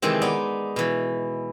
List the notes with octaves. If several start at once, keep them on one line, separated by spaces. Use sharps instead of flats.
C3 D#3 E3 G#3 C4
B3 D#4 D5
B2 E3